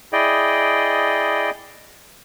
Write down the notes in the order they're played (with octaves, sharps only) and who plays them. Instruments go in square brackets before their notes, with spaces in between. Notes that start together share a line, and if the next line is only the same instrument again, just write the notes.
[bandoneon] E4 G#4 D5 D#5 G5